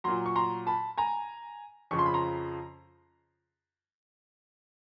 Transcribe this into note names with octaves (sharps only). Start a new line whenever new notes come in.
A#2 F#3 A#5 C6
C#6
A#5 C6
A5 B5
G#5 A#5
F2 C#3 F3 C#6
C6
B5
A#5 C6